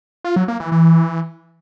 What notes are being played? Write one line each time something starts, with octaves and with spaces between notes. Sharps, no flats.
F4
F#3
A#3
E3
E3